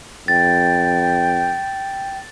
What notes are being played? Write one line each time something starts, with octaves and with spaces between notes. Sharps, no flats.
F2 G5 A6